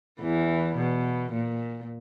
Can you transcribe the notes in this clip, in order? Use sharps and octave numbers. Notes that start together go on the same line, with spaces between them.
E2 E3
B2
A#2